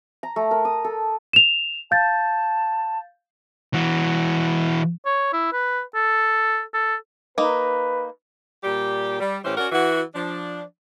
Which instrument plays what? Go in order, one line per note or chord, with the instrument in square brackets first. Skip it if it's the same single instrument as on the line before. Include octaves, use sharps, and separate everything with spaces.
[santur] A#5
A3
A#4
D#6
A4
[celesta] E7 F7
[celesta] F5 G6 A6 [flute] A5
[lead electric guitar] E3 F#4
[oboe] C#5
E4
B4
A4
A4
[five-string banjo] A#3 D#4 [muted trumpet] B4
[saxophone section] A#2 G3 G4
G3
A2 E3 C#4 G4 C5
C#4 F#4 A#4 D5 F#5
E3 F#4
F3 D4